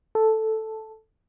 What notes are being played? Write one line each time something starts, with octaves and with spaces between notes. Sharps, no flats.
A4